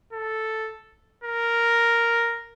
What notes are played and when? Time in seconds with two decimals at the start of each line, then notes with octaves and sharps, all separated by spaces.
0.13 A4
1.24 A#4